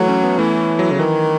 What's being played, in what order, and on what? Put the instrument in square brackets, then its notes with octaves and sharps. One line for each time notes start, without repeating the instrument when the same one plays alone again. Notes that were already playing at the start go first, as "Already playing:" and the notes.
Already playing: [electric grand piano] E3 A3 [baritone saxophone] F#3
[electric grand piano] C#4
B3
[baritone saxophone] E3 [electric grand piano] A3
[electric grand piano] F#3
[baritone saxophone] C#3
[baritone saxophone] D#3 [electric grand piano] E3